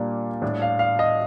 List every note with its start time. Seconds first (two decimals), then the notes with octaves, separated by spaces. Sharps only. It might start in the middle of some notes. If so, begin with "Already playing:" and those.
Already playing: A#2 G3 A#3 D4
0.42 A2 G3 D4
0.62 F5
0.79 F5
0.99 D#5